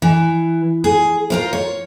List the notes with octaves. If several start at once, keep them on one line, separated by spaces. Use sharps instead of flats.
E3
G#4
F4 A#4 C5
C#5